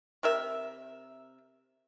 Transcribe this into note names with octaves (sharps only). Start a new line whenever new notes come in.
C3 A#4 E5